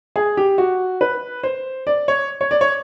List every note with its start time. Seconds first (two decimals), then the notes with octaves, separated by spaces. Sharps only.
0.16 G#4
0.37 G4
0.58 F#4
1.01 B4
1.43 C5
1.87 D5
2.08 C#5
2.41 C#5
2.51 D5
2.61 C#5